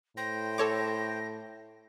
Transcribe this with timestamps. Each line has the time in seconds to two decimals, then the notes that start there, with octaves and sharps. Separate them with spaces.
0.17 A2 C5 G5 A#6
0.58 A4 C#5 D6